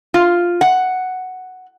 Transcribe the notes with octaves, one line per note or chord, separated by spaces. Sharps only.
F4
F#5